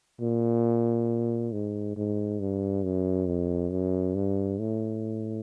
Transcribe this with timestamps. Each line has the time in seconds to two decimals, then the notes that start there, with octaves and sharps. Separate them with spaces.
0.21 A#2
1.53 G#2
1.97 G#2
2.40 G2
2.84 F#2
3.27 F2
3.71 F#2
4.15 G2
4.59 A2